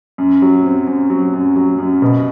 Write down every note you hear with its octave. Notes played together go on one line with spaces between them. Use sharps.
F#2
F#3
C4
F#2
F#3
F#2
F#3
F#2
B2